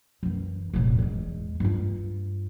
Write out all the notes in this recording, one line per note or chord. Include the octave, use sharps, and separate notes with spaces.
F#2 E3
E1 A1
E2 G#3
G2 F4